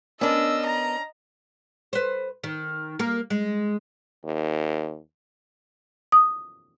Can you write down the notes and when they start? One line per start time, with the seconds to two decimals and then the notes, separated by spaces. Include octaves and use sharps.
0.21 B3 C#4 D4 A#4 D5 D#5 E6
0.67 A#5
1.93 B4 C5
2.44 D#3
2.99 A#3 A#4
3.30 G#3
4.25 D#2
6.12 D#6